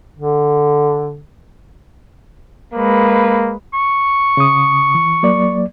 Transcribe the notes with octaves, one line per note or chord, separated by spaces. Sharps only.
D3
G#3 A#3 B4
C#6
C#3 D#6
E3
F#3 A#3 D5